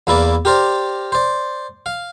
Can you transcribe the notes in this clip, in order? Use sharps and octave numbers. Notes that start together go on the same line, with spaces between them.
E2 A#3 E4 B4 D5
G4 A#4 C5 D5
C5 D5
F5